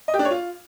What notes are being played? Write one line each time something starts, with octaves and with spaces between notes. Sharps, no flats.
D#5
G4
D4
C#5
F4